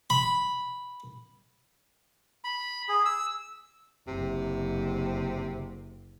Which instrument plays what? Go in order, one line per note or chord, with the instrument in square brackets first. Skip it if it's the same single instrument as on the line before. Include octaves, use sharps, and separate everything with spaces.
[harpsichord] B5
[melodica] B5
G#4
E6
[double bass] F#1 [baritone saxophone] C3